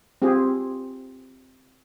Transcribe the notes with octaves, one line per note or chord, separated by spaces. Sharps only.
C4 F4 G4 G#4